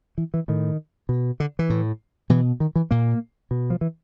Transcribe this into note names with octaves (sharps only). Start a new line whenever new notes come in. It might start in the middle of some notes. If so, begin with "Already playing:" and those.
E3
E3
A2 D#3
B2
D3
E3
A2
B2 E3
D#3
E3
A#2 A#3
B2
F3
E3